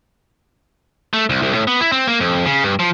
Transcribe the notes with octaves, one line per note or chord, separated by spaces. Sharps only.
A3
C2
C2
A2
B3
E4
C4
A#3
F2
C#3
G2
F3